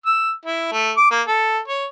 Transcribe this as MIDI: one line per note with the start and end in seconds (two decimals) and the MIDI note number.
0.06 0.32 88
0.45 0.69 64
0.72 0.91 57
0.97 1.10 86
1.11 1.21 58
1.27 1.58 69
1.68 1.85 73